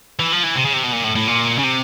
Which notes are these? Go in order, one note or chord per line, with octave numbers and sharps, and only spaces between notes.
E3
F3
E3
C3
C#3
C3
B2
A#2
A2
A2
A#2
C#3
C3